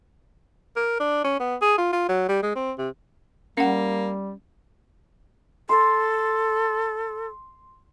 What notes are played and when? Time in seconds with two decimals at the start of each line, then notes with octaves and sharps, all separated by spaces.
0.76 A#4
0.99 D4
1.24 C#4
1.39 B3
1.62 G#4
1.78 F4
1.93 F4
2.08 F#3
2.29 G3
2.42 G#3
2.55 C4
2.78 C3
3.57 G3 A#3 C#4 F#5
5.69 A4 C6